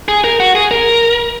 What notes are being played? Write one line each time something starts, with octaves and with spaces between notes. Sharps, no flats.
G#4
A#4
F#4
G#4
A#4